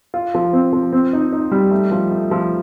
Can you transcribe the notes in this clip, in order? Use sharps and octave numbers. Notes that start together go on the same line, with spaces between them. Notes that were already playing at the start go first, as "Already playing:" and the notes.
F4
F3
C4
F3
C4
D#4
D#4
G3
A3
F3
A3
F3